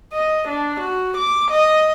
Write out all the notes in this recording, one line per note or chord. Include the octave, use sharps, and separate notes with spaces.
D#5
D4
F#4
D6
D#5